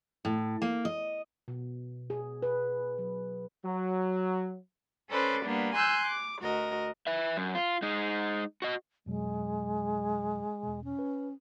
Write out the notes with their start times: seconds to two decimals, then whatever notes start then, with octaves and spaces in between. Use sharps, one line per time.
0.25 A2
0.62 A#3
0.85 D#5
1.48 B2
2.10 G#4
2.43 B4
2.98 F#3
3.64 F#3
5.10 C#4 A4 B4 C5 D5
5.46 G3 A#3 B3 D4
5.75 G#5 C6 E6 F#6 G6
6.06 D6
6.41 D2 F#4 A#4 D#5
7.07 B4 E5
7.37 F#2
7.55 F4
7.82 G#3 D#4
8.62 F#4 D#5
9.06 F2 B2 F#3 G#3
10.63 E2 B2
10.84 C#4
10.99 B4